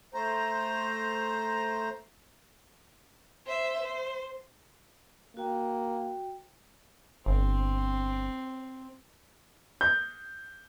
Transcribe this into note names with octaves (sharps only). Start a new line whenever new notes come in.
A3 C5 A#5
C5 E5
C5
A#3 F#4 G5
G1 C4
G6